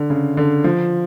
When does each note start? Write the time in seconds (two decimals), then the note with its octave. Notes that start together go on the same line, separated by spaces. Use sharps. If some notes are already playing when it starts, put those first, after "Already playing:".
Already playing: D3
0.10 C#3
0.37 D3
0.64 F3